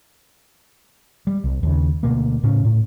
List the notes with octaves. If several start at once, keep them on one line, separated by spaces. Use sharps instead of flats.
G3
C2
D#2 C#3
D2 B2 A#3
A2 C#3 C#4
A2